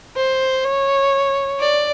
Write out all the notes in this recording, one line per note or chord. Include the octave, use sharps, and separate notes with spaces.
C5
C#5
D5